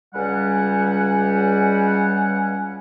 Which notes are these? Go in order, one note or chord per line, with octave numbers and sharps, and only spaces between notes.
C#2 G3 F#5 G#5